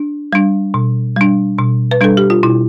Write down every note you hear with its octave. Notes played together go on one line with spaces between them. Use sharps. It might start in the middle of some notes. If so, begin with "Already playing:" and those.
Already playing: D4
G3 D4
B2
G3 D4
B2
B4
G3 D4 A4
G4
F4
B2 E4